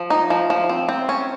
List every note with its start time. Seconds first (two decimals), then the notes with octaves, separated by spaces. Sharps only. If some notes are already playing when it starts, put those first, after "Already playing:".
Already playing: F3
0.10 D#4
0.30 F3
0.50 F3
0.69 C4
0.89 C4
1.09 C#4